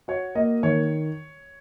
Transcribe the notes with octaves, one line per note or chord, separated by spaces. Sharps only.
F#4 C#5
A#3 D#5
D#3 C#5